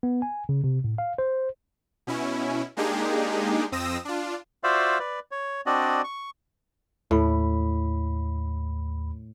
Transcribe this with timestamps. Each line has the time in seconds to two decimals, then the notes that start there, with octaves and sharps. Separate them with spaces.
0.03 B3
0.22 G#5
0.49 C#3
0.64 C3
0.84 A2
0.98 F5
1.18 C5
2.07 B2 C#4 E4
2.77 G#3 A#3 D4 D#4 G4 G#4
3.72 F2 C4 D#6 E6 A#6
4.05 D4 F4
4.64 F4 F#4 C5 D5 E5 F5
5.00 B4 D5
5.31 C#5
5.66 C4 D4 F#4 D5 D#5
6.04 C#6
7.11 D#2 A2 B5